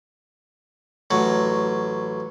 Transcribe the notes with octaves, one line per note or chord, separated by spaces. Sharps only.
A1 F#3